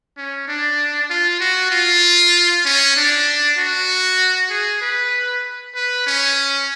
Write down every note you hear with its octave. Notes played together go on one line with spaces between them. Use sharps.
C#4
D4
F4
F#4
F4
C#4
D4
F#4
G#4
B4
B4
C#4